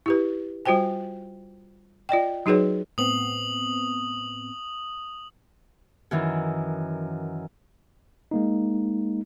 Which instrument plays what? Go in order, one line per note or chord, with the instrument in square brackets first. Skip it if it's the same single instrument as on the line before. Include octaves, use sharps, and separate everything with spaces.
[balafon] E4 G4 B4
G3 F4 F#4 C5 G5 G#5
F4 D5 D#5 G5
F#3 D#4 F#4 G#4 B4 C#5
[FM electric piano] A2 B3 C4 [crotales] D#6 F#7
[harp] F#2 D#3 E3
[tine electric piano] G#3 A#3 D#4